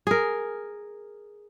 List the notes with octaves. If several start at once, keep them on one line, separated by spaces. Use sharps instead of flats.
G#4 A#4